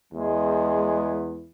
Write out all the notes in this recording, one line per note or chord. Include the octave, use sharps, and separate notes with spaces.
E2 G#3